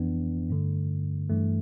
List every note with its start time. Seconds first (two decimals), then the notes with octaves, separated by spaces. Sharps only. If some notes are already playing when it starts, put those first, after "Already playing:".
Already playing: F2 E3 B3 D4
0.50 G2 D3 A3
1.30 G2 E3 A3